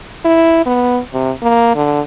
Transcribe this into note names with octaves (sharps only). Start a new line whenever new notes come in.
E4
B3
C3
A#3
D3